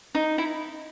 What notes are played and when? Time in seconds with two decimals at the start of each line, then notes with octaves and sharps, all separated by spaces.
0.15 D#4
0.38 E4